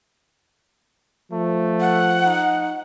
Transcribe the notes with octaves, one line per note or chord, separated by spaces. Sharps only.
F3 A3
F#5
D#4